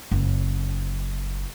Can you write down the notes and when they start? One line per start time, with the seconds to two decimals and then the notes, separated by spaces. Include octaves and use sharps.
0.11 F#1